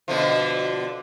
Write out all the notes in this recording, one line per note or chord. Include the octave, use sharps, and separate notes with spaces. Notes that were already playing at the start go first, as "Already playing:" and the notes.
B2 D3 F3